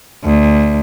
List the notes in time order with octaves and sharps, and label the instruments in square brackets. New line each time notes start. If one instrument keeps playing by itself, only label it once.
[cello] D2